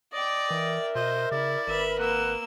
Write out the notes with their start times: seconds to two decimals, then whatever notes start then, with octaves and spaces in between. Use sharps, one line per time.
0.13 D5 D#5 G5 D6
0.51 E3 A#4 E5
0.95 B2 C5 D#5
1.32 C#3 E4 D5
1.68 G#1 A#4 B4 E5 B5
1.99 A#3 F#5 E6